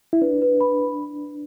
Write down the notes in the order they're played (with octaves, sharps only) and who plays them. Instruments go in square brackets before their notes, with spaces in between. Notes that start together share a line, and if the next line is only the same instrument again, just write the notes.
[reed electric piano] E4
[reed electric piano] D4 [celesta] B4
[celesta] B4
B5